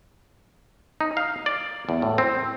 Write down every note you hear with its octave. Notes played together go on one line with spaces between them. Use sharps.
D#4
F5
D5
E2
A2
C4